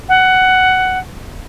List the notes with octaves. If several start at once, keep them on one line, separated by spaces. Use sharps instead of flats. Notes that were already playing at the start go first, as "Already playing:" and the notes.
F#5